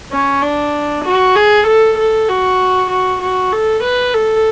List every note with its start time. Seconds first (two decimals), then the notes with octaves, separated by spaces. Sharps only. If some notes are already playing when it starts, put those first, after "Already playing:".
0.12 C#4
0.43 D4
1.05 F#4
1.35 G#4
1.67 A4
1.98 A4
2.29 F#4
2.90 F#4
3.21 F#4
3.52 A4
3.84 B4
4.14 A4